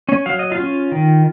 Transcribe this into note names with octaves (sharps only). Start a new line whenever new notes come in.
C#4 C#5
F#3 F5
D#5
F4 F5
C#4
D#3